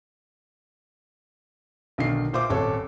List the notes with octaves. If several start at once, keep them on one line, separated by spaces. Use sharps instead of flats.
B1 D3 D#3 C7
A#2 C5 E5 D6
D#1 G#1 A4 C#5